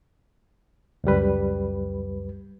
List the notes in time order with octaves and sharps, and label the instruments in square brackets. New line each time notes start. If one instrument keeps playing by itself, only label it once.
[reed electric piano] C#2 F#2 G3 B4